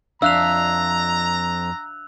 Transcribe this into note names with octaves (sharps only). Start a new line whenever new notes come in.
F2 D4 E5 F5 A#5 E6 F#6 F7